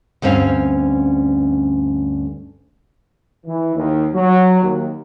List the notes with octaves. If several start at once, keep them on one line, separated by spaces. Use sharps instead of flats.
D2 G2 C4 C#4 F5
E3
D#2
F#3
D#2